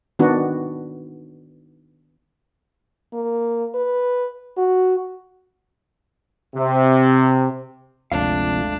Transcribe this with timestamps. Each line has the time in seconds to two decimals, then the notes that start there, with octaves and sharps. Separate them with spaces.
0.19 D#3 B3 D4 F#4
3.13 A#3
3.75 B4
4.57 F#4
6.55 C3
8.12 G1 D2 C3 F3 G#3 A3 D4 F5